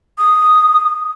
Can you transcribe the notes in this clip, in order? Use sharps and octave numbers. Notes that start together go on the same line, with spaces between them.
D#6